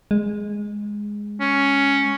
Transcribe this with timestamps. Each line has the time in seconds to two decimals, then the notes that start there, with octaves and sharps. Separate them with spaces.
0.11 G#3
1.40 C#4